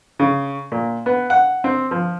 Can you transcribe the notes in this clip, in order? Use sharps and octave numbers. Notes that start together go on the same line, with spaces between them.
C#3
A#2
B3
F#5
C4
F3